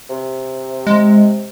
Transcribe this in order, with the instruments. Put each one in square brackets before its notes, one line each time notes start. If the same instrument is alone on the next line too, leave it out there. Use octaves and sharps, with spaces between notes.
[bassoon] C3
[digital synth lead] G#3